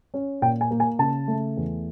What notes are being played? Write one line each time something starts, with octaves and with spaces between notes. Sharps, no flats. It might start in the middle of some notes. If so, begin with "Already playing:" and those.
C#4
A#2 G5
G#5
A#3
G#5
C#3 A5
A3
E2